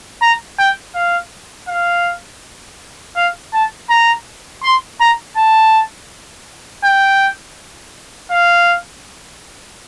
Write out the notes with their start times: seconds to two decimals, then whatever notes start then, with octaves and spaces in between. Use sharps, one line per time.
0.22 A#5
0.59 G5
0.95 F5
1.68 F5
3.16 F5
3.53 A5
3.90 A#5
4.63 C6
5.00 A#5
5.37 A5
6.84 G5
8.31 F5